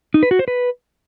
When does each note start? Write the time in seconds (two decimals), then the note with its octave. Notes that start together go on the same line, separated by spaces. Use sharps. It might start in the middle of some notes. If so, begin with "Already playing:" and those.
0.14 D#4
0.23 B4
0.31 F#4
0.39 C5
0.48 B4